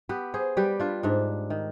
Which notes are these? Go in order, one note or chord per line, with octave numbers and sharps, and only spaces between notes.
B3 G4 B4
G#4 C5
G3 G4 B4
D4 F4
G#2 D4
D#3